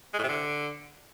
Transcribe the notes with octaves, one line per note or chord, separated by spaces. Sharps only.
G#3
A2
C3
D3